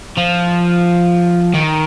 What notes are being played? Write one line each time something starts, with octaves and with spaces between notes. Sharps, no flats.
F3
D#3